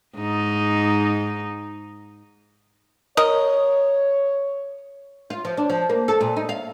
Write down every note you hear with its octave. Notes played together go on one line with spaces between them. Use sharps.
G#2 D#4
A#4 C#5 D#5
F4
F3
D4
F3
A#3
A4
A#2
D#4
F5